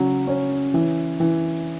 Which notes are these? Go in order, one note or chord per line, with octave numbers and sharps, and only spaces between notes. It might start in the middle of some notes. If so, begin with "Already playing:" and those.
Already playing: C#3 F#3 C#4
C#4
E3
E3